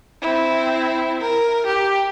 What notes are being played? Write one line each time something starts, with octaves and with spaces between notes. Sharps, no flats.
C4 E4
A#4
G4